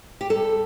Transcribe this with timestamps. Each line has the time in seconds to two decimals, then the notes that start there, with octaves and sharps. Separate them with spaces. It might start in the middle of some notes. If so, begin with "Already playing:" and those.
0.21 G4
0.30 G3 A4